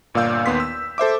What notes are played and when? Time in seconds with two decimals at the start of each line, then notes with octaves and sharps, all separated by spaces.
0.14 G1 A#2 D5 F5 E6 G6
0.46 D#2 B3 C6 B6
0.60 E6
0.98 A4 C5 E5 D6